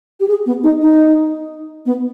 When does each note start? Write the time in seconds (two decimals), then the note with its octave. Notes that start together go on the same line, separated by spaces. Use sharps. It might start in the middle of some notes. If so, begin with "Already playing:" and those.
0.20 G4
0.28 G#4
0.46 B3
0.63 D#4
0.81 D#4
1.86 B3